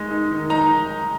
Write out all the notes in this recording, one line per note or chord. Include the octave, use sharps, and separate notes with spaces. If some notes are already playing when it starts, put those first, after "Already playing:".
Already playing: G#3 D#4
D#4
D#3
D#4 A#5